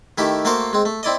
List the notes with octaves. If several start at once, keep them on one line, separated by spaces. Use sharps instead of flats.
D#3 A3 E4 G4
A3 A#3 F#4 A#4 C5 F5
G#3 C4
A3
C4 E4 D5 D#5